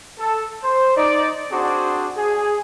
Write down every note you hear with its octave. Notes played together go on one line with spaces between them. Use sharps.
A4
C5
D#4 D5
C4 D4 F#4 G#4 C5 D5
G#4